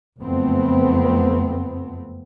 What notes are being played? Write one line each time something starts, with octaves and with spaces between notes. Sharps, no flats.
F#1 F2 A3 B3 C4